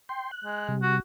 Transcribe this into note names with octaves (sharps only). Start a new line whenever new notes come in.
G5 C6
F#6
G#3
C3 G3
F#4